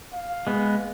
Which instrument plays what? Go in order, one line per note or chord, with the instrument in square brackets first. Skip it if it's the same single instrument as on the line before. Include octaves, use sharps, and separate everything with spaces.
[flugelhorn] F5
[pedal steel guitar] G#3 B3